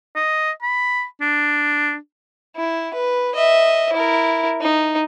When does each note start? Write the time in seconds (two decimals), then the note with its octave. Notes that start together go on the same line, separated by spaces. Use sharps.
0.16 D#5
0.62 B5
1.21 D4
2.56 E4
2.94 B4
3.35 D#5 E5
3.93 E4 A#4
4.61 D#4